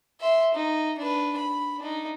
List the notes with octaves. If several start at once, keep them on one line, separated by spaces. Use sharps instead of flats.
E5 C6
D#4
D4 B4
B5
D4 D#4